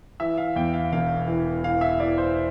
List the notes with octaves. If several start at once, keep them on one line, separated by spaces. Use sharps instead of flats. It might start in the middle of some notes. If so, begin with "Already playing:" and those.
E3 E5
F5
E2 G5
F5
E1 F5
E3
E3 F5
E5
E3 D5
C5